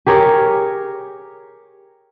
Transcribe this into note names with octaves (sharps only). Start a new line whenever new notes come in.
G4 G#4 A#4 C#5